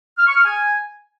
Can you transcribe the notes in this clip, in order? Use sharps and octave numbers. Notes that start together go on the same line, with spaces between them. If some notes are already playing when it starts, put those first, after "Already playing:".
F6
C#6
F6
G#5